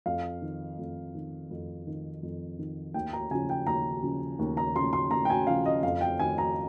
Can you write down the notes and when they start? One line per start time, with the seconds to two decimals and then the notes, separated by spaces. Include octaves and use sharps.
0.06 F2 F5
0.42 D#3
0.79 F2
1.15 D#3
1.51 F2
1.87 D#3
2.23 F2
2.59 D#3
2.94 D#2 G5
3.13 A#5
3.31 C#3 F3 G#5
3.50 G5
3.67 D#2 A#5
4.03 C#3 F3
4.39 D#2
4.57 A#5
4.76 C#3 F3 C6
4.93 C6
5.11 D#2 A#5
5.25 G5
5.30 G#5
5.47 C#3 F3 F5
5.66 D#5
5.83 F2 F5
6.01 G5
6.20 D#3 G#5
6.38 A#5